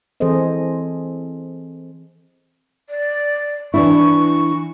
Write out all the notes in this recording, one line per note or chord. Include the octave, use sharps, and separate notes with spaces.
E3 C4 G#4 A4 C5 D#5
D5
E3 D4 E4 C#6